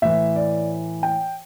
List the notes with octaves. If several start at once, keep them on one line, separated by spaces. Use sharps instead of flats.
A2 E3 E5
D5
G5